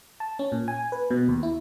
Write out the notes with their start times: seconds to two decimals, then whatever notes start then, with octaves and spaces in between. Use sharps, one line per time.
0.20 A5
0.39 C#4
0.52 A#2
0.68 G#5
0.92 B4
1.11 B2
1.29 D#2
1.43 E4